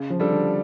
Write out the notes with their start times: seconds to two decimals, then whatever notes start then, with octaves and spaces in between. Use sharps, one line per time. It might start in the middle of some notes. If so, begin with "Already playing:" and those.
Already playing: C#3
0.10 F3
0.20 G3 D4 A4
0.30 D3